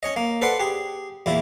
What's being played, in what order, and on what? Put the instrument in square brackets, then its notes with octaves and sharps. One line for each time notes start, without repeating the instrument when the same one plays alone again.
[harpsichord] C#4 C#5 D#5
A#3
A4 B4 C5 D5 F#5
G4 G#4
E2 A#2 E4